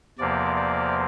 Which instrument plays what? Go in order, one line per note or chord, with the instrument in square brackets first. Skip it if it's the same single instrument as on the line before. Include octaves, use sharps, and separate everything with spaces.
[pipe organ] E2 C3 F3 A#3 D5
D5